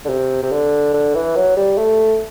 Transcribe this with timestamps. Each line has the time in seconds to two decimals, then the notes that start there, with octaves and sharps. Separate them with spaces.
0.05 D3
0.09 C3
0.43 C3
0.52 D3
0.94 D3
1.15 E3
1.36 F#3
1.57 G3
1.78 A3